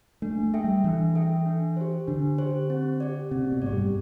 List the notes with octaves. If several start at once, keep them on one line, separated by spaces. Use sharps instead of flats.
A3 D4
A3
A4 E5 G5
G3
E3 D4
A4 E5 G5
D4
G4 C5
D3 D4
G4 C5
C4
G4 D5
C3 C4
B2
A2 G4 D5
G2